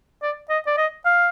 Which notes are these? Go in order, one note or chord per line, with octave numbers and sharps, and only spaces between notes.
D5
D#5
D5
D#5
F5